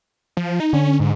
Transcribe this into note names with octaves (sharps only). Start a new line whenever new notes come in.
F3
D#4
D3 C#4
G#2